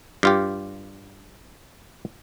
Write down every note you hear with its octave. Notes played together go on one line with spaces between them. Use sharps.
G2 F4 G4